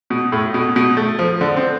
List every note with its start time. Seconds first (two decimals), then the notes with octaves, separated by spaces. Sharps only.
0.10 B2
0.32 A2
0.54 B2
0.76 B2
0.97 A3
1.19 F3
1.41 D3
1.57 C4